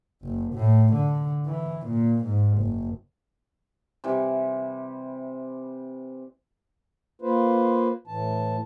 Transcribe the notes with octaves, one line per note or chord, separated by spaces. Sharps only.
F#1
A2
D3
E3
A#2
G#2
F#1
C3 E3 G3
A#3 F4 B4 C5
A2 E3 A5